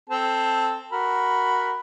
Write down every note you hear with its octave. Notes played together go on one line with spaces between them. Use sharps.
C4 A4 A5
F#4 A#4 B5